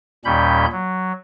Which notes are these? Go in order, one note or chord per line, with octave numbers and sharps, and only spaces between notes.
D#2 A#2 G3 C#4 B5 G6
F#3